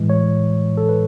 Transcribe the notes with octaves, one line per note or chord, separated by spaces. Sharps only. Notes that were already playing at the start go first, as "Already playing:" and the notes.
Already playing: A2 E3 G#3
C#5
A4
B4